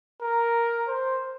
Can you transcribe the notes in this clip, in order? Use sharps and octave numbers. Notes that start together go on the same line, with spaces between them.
A#4
C5